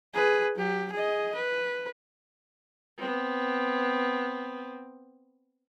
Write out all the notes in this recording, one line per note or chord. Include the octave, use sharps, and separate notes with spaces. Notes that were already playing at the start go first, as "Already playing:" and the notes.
G#4 B4
F#3 G4
G#4 D#5
B4
B3 C4